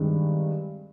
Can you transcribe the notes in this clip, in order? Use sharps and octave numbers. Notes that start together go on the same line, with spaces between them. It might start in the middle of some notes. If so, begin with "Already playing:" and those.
Already playing: G2 D#3 G#3 C4